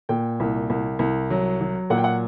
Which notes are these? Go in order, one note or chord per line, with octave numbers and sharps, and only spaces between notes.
A#2 G5
C2
C2
C2
F#3
F#3
A#2 F#5
G5
F#5